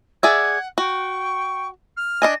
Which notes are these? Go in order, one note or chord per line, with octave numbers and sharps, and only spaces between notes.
G#4 D5 E5 F#5 G#6
F#4 G5 C#6
F6
D4 D#5 G#5 A#6